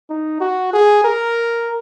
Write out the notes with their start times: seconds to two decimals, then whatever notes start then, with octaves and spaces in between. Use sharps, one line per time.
0.10 D#4
0.40 F#4
0.73 G#4
1.04 A#4